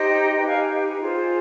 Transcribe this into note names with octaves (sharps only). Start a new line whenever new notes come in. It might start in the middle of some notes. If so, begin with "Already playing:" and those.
Already playing: D#4 G4 C5 D#5 G5
D#4 G4 B4 D#5 G5
F5 G#5
F4 G#4 C5